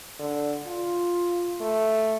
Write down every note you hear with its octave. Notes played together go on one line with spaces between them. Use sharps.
D3
F4
A3